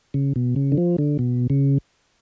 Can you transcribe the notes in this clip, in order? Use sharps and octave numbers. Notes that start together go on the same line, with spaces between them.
C#3
B2
C#3
D3
F3
D3
B2
C#3